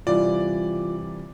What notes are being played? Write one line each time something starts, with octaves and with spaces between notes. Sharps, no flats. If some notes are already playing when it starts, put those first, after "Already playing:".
C3 E3 G3 F4 D5